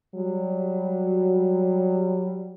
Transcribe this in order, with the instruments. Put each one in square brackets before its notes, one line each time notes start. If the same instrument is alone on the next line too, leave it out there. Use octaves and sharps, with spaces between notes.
[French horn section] F#3 G3